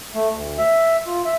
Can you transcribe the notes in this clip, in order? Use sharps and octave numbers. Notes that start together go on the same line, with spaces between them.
A3
D2
E5
F4
E5